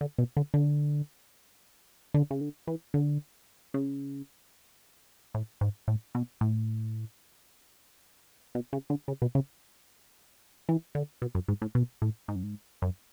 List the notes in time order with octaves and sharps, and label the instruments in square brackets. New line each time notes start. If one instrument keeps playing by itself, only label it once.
[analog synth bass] D3
B2
D3
D3
D3
C#3
D3
E3
D3
C#3
A2
G#2
A2
B2
A2
B2
C#3
D3
C#3
B2
C#3
E3
D3
B2
F#2
G#2
A2
B2
A2
G#2
F#2
G#2
F#2